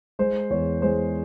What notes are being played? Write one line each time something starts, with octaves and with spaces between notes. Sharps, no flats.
G#3 C5
E2 C#5
G#3 C5